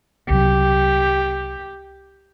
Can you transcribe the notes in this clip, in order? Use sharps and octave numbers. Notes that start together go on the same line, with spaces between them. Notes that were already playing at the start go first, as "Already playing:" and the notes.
C2 C3 F#3 G4